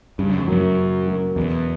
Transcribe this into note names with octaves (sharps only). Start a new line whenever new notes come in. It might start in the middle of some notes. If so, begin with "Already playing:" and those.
G2 C#3
F#2
F2
F#2 F#3 A#3
C#3
F#3 A#3
E2 B2